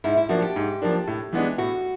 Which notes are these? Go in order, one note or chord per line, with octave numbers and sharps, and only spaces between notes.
G#2 E4
E4
F3 A#3 D4 F#4
G4
G#2
F3 A#3 D4
A2
E3 G#3 B3 D4
A2 F#4